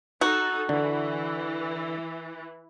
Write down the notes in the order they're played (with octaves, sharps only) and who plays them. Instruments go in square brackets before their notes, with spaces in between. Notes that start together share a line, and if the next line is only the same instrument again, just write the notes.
[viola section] D#4 A4 [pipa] F#4
[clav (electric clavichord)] D3 [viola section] E3